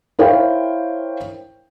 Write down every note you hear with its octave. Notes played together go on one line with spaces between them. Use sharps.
E4 A#4 C5 C#5 F5 G5